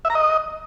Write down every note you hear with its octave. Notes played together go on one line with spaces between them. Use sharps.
E5
A#5
D#5